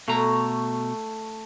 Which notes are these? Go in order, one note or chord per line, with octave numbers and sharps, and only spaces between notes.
B2 A3 A#5